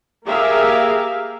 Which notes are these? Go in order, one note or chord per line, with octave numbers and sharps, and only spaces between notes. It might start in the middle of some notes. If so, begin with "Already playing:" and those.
A#3 G4 G#4 A#4 E5 F5